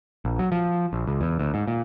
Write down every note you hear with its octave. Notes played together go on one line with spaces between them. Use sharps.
A#1
F#3
F3
A#1
C#2
E2
D2
G#2
A#2